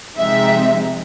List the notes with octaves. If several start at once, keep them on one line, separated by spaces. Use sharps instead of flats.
C3 F3 G#3 C4 D#4 E5